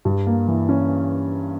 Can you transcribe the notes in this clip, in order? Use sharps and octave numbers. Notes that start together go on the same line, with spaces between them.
G2
A#3
E3
C#4